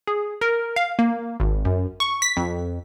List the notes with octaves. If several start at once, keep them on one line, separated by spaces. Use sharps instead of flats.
G#4
A#4
F5
A#3
G#1
F#2
C#6
B6
F2